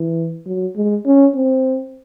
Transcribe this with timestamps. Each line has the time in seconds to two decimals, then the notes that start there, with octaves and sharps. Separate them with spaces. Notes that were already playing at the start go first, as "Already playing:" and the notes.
Already playing: E3
0.46 F#3
0.76 G#3
1.05 C#4
1.35 C4